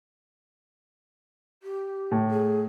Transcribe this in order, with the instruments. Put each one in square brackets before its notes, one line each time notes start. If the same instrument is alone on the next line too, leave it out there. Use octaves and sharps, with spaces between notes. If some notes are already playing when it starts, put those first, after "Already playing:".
[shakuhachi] G4
[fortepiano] A2
[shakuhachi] G#4